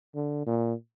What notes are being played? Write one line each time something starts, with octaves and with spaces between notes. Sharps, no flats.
D3
A#2